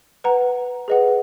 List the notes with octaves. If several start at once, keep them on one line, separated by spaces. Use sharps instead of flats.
B4 F#5 A#5
G#4 B4 D#5 F#5